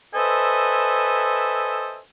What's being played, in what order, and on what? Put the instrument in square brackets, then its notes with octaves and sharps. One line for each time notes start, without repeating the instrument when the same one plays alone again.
[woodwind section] A4 B4 C5 D#5 E5 G#5